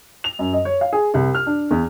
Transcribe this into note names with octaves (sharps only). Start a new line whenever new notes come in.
F7
F#2
D#5
C#5
F5
G#4
C2
F6
D4
E2